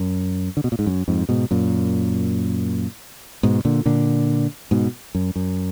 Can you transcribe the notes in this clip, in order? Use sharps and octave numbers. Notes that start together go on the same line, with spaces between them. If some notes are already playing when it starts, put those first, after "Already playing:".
Already playing: F#2
D3
B2
A#2
G#2
F#2
F2 G#2
G#2 B2
F#2 A#2
G#2 B2
A#2 D3
A#2 D3
G#2 B2
F#2
F#2